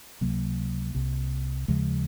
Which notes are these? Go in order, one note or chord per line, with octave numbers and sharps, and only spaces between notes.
C#2 C3 F#3 A#3
C2 C3
D#2 C#3 F3 G#3